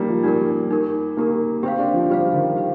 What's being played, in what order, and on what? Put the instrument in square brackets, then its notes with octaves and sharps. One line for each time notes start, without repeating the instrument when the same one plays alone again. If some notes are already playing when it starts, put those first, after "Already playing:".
Already playing: [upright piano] G3 A#3 [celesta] D#4 G4 A#4
[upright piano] F3
[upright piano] G3 [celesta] D#4 G4 A#4
[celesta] D#4 G4 A#4
[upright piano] A#3 [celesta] D#4 G4 A#4
[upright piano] C4 [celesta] G4 C5 F5
[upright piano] D4
F3
[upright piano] G3 [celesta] G4 C5 F5
[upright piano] D#3
[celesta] G4 C5 F5